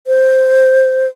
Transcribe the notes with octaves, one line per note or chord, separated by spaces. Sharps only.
C5